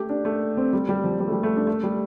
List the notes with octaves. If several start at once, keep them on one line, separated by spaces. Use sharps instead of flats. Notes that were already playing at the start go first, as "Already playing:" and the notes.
Already playing: A3 G4
D4
A3
C4
G3
G3
F3
G3
A3
G3
A3
D4
A3
G3